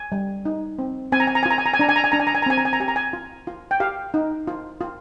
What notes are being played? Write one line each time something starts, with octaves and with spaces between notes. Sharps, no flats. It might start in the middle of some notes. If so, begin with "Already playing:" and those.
Already playing: G#5
G3
D#4
C4
C4 G#5
A#5
G#5
A#5
G#5
F4 A#5
G#5
A#5
G#5
D4 A#5
G#5
A#5
G#5
D4 A#5
G#5
A#5
G#5
A#5
C4 G#5
A#5
G#5
A#5
G4 G#5
A#5
G#5
F4
F4
G5
G4 F5
D#4
F4
F4